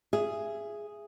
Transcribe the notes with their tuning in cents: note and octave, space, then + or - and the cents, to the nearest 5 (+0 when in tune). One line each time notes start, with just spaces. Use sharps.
G#4 +0 E5 +25